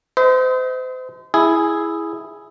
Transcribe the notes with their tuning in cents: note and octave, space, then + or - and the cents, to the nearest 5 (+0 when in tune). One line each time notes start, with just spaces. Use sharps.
C5 -35 D#5 +35
E4 +0 G#4 +0